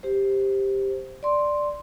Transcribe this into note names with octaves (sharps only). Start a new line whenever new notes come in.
G4 C5
D5 C6